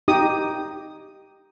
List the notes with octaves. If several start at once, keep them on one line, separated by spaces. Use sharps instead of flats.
D#4 G4 D#6